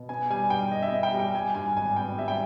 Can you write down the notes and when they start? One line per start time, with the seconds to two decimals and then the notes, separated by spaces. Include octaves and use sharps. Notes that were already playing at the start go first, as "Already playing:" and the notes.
Already playing: B2
0.09 B3 G#5
0.30 G3 G#5
0.50 G2 G5
0.71 G2 D#5
0.83 E5
0.88 B3 D#5
1.03 G5
1.13 G3
1.19 G5
1.35 G3 G#5
1.55 G2 G#5
1.77 G#1 G#5
1.96 B3 G5
2.17 G3 E5
2.28 G5